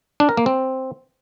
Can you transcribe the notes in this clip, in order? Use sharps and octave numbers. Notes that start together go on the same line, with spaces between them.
D4
A#4
A#3
C4